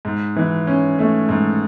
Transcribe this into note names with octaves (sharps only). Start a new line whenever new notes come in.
G#2
E3
C#4
A3
G#2